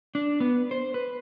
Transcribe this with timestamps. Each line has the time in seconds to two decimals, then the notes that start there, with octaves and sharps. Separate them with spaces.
0.15 D4
0.40 B3
0.71 C5
0.94 B4